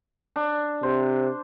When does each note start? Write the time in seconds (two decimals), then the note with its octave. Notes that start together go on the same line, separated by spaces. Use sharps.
0.36 D4
0.83 C3 C5